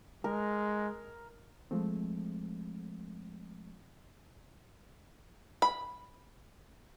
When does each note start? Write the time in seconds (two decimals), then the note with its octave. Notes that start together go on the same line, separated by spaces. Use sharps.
0.24 G#3 A#4
1.71 F3 G#3 A3 C4
5.62 B5